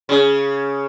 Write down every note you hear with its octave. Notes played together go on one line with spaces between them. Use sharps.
C#3